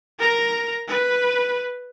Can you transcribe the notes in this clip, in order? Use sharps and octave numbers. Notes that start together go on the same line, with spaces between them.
A#4 A#5
B4